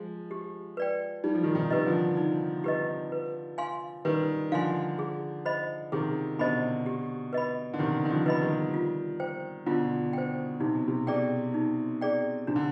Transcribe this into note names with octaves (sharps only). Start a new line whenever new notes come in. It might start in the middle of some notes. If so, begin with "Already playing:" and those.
Already playing: F3 G#3
G4
B4 D5 G5
G3 D#4
F3
D#3 G3
C3 D#3
G4 B4 D#5
D3 F3
D#4
G4 B4 D#5
B4
F5 G#5 C6
D#3 G3 B4
D3 F3 F5 G#5 C6
G#4
C5 D#5 B5
C3 D#3 G#4
B2 D3 C5 D#5 B5
G4
B4 D#5 B5
D3
C3 D#3 G4
D#3
D3 F3
B4 D#5 B5
D#3 G3
F4
C5 G5
B2 D3 F4
C5 G5
C3 D#4
B2
C3
B2 G#4 D5 G5
D#4
G#4 D5 G5
C3 D4
D3